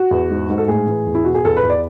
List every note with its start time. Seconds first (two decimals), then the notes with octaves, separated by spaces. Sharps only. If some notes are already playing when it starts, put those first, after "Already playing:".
Already playing: F#4
0.11 E2
0.30 G#2
0.50 G#2
0.58 A4
0.68 A2 G#4
0.87 E3
1.06 E2
1.15 E4
1.25 B2 F#4
1.35 G#4
1.45 E2 A4
1.57 B4
1.63 E2
1.70 D5